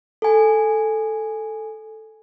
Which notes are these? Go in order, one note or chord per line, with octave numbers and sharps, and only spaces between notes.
A4 G#5